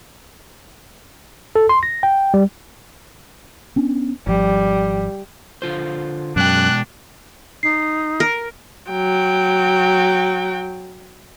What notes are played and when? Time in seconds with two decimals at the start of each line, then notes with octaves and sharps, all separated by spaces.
1.56 A4
1.69 C6
1.83 A#6
2.03 G5
2.34 G3
3.76 B3 C#4 D4
4.27 G#1 F3 G3
5.62 D3 F4 C5
6.36 F#2 B2 G#3 D4 G5 F#6
7.63 D#4 C7
8.20 A#4
8.91 F#3 G5